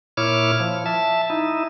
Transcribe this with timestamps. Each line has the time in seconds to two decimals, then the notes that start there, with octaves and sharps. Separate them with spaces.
0.17 A#2 E4 C#5 D6 F6
0.60 F3
0.86 E5 A5
1.30 D#4 E4